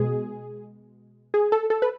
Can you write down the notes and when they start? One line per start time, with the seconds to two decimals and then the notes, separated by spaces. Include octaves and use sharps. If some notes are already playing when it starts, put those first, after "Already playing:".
Already playing: B2 G#3 G#4
1.34 G#4
1.52 A4
1.70 A4
1.82 B4